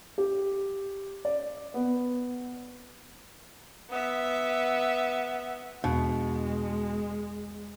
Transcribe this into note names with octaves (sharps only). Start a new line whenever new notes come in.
G4
D5
B3
B3 E5
E2 B2 G#3